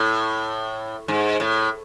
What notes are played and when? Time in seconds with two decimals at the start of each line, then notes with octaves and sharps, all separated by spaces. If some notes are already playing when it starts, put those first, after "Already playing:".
Already playing: A2
1.08 G#2
1.40 A2